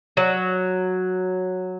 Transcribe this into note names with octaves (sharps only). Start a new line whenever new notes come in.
F#3